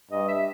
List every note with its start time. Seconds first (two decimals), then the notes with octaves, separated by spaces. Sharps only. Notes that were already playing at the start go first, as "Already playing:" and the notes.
0.11 G2 D#5
0.28 E5